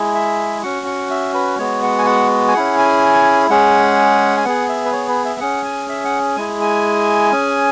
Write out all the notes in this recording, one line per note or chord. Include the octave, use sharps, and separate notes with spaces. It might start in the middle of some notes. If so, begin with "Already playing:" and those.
Already playing: G#3 E4 G#4
E5
C#4 F#4 F#5
F#5
E5
B4
G#3 B3 F#4 C#5
F#5
G#5
F#5
G#5
C#4 E4 G#4 F#5
G#5
G#3 C#4 G#4 F#5
G#5
B3 G#4 F#5
E5
B4
C#5
B4
E5
C#4 G#4 F#5
G#5
E5
F#5
G#3 E4 G#4 G#5
G#5
C#4 G#4